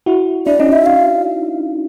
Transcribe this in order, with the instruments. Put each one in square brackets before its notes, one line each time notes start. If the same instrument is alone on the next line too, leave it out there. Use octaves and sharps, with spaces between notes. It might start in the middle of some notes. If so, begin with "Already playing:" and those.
[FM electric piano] E4 F#4
[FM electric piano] D4 E4 [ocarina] D5
[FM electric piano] C#4 D#4 [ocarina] D#5
[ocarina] E5
F5